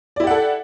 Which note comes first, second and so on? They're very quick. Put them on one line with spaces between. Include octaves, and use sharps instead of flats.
D5 E4 G4 F#5 A4